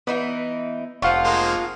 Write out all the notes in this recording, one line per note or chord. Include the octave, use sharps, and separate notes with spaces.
E3 B3 D#4 E4
F1 F3 F4 F5 F#5 C#6
G#3 A#3 C5